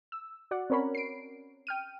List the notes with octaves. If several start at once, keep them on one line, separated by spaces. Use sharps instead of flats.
E6
F#4 D5 F#5
C4 C#4 A#4 C#5 B5
C7 D7
G5 F6 D#7